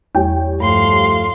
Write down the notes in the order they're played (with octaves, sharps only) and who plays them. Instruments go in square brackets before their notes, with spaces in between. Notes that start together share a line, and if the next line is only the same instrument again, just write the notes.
[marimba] E2 [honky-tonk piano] G3 C#5 G5
[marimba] G2 [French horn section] F3 A3 [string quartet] F5 C6